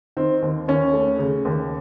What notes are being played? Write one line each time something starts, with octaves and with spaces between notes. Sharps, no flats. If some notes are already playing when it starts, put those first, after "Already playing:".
D#3 C4
D#2
D#2 C#4
A3
C#3
D#2